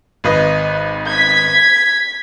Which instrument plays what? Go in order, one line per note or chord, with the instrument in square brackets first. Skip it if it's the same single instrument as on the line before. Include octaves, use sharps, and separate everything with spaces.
[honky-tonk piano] G#1 B4 D#5
[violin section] G#6 B6